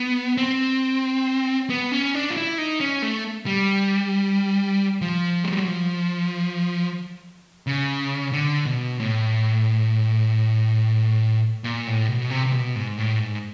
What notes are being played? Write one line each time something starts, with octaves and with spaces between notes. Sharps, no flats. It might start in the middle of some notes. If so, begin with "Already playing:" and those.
Already playing: B3
C4
B3
C#4
D4
F4
E4
D#4
C#4
A3
G3
F3
G#3
G3
F#3
F3
C#3
D3
B2
A2
A#2
A2
B2
C3
C3
B2
G#2
A2
G#2